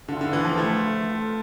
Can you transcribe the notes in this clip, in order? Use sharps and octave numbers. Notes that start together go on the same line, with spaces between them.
D3 B3 F4 B4 E5 G5
D3
E3
F3
A3
C4 F4 A4